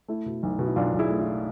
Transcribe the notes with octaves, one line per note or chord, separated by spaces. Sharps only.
A3 E4
B2
B1
B2
E4
B1 D4 F4
B1
E4 G#4
A3
E4